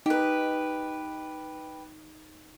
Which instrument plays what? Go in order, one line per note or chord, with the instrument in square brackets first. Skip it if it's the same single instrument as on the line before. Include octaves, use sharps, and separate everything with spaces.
[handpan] D#4 [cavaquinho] G4 B4